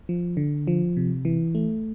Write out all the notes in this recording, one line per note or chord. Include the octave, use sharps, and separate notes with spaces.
F3
D3
F3
C3
E3
A3